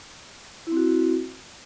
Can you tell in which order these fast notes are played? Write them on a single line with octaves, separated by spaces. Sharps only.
E4 C4 F#4